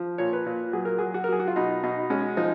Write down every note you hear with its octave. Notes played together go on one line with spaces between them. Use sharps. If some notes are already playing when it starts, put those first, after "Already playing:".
Already playing: F3
A#2 C#5
B4
A#2
F#3 G#4
A#4
F#3 G#4
F#4
A#4
F#3 G#4
F#4
F4
B2 D#4
B2 D#4
G#3 C#4
F3 D#4